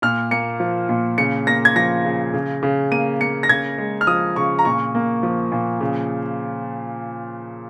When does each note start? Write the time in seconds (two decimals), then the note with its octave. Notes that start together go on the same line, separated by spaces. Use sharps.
0.02 A#2 F6
0.31 A#3 C#7
0.60 F3
0.89 A#2
1.18 C#3 C#7
1.47 A#3 A#6
1.65 G#6
1.76 F3 A#6
2.05 C#3
2.34 C#3
2.63 C#3
2.91 A#3 D#7
3.21 A#3 C#7
3.43 A#6
3.49 C#3 G#6
3.78 G#3
4.01 F6
4.07 F3 D#6
4.36 C#3 C#6
4.59 A#5
4.65 A#2 C#6
4.95 A#3
5.23 F3
5.52 A#2
5.81 C#3